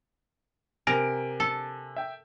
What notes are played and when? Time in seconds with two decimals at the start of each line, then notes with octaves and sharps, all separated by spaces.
0.87 C3 A#4 G#5 D7
1.40 A4
1.96 E5 G5